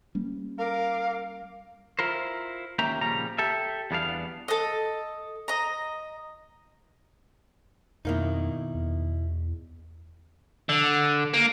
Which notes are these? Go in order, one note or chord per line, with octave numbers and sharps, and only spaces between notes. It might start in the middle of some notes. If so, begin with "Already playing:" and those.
G3 A#3 C#4
A#4 F5 D6
E4 F4 A#4 C5
D#2 A#3 C#4 E5 G5 A#5
A#2 C#3 F3 G3 A#5
G4 A4 E5
E2 G3 B3 D4 F5
A4 D#5
D#5 A#5
F2 B2 D#3 A#3 D#4 E4
E2
D3
A#3